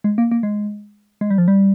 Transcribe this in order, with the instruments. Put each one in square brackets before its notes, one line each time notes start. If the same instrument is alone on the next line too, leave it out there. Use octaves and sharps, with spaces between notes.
[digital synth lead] G#3
A#3
A#3
G#3
G#3
G3
F3
G3